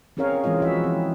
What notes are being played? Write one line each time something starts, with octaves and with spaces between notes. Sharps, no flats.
C4 C#4 G#4 A#4 C#5 F5
E3 G#3 C4 F4 D#5
F3 E4 F#4 E5
C4